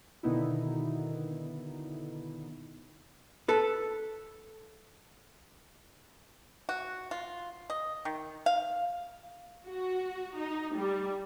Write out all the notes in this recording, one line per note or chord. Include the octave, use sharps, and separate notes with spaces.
B2 D3 D#3 B3 D#4 E4
A4 B4
F#4
F4
D#5
D#3
F5
F#4
D#4
G3